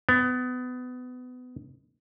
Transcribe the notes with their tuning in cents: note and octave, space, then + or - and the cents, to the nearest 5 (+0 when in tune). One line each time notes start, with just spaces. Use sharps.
B3 +25